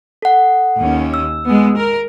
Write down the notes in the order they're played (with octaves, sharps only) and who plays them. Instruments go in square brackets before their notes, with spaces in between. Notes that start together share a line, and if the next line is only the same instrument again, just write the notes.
[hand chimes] A4 F#5
[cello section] D#2 C#4
[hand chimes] E6
[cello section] G#3 B3
A#4